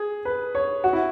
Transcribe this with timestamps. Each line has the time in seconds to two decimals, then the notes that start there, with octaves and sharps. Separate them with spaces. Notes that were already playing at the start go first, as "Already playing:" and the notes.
Already playing: G#4
0.25 B4
0.55 C#5
0.84 F#4
0.93 E4